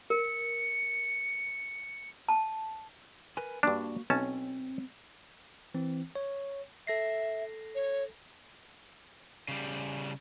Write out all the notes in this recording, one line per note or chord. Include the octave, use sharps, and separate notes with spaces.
A#4 C#7
A5
A#4 B4 G#5
G2 A#3 D4 F#4
B1 C4 C#4 A5
E3 C4
C#5
A4 E5 A#6 C7
C#5
C#3 G3